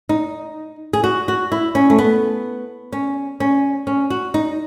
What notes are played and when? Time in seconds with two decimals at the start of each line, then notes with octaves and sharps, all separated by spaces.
0.09 D#4
0.93 G#4
1.04 F#4
1.28 F#4
1.52 E4
1.75 C#4
1.90 A3
1.98 B3
2.92 C#4
3.40 C#4
3.87 C#4
4.10 F#4
4.34 D#4